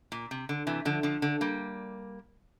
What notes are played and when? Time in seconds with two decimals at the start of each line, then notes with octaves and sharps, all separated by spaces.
0.12 A#2
0.31 C3
0.49 D3
0.67 C3 E3
0.85 D3 F3
1.03 D3 F3
1.22 D3
1.41 G3 A#3